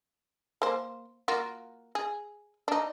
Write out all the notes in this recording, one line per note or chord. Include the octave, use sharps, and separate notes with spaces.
A#3 C5
A#3 F4 F#4
G#4
D4 D#4